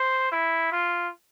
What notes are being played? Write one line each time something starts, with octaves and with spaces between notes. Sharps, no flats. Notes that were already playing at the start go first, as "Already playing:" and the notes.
Already playing: C5
E4
F4